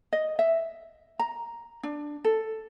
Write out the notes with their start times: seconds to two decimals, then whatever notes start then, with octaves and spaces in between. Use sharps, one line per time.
0.13 D#5
0.39 E5
1.19 A#5
1.83 D4
2.24 A4